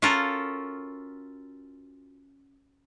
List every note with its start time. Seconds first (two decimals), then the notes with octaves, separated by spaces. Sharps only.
0.02 C#4 F4 F#4 A4 A#4